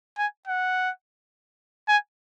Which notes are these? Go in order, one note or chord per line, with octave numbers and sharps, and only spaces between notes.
G#5
F#5
G#5